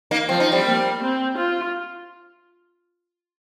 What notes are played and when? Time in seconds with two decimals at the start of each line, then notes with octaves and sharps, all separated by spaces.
0.11 A#3 D#4
0.29 F3 C4
0.40 D#4
0.52 G3 C4
0.65 A#3
1.01 C4
1.38 F4